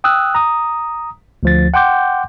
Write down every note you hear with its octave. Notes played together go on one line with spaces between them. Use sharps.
G5 D#6 E6 F#6
A#5 D#6
D2 F3 A6
F#5 G5 C6 D6 G6